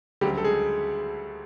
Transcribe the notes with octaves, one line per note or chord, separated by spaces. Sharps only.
D2 C#3 F#3 G3 G4
A4
G#3 G#4